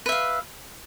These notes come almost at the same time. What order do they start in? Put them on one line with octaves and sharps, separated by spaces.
B4 E5 F5